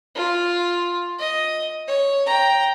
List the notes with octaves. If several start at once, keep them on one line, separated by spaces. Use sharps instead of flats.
F4
D#5
C#5
G5 A#5